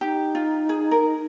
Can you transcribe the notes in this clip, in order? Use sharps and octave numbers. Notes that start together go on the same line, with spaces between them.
D#4 G4
F4
G#4
A#4